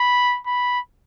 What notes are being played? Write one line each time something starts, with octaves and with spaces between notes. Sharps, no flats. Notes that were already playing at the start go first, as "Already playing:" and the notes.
Already playing: B5
B5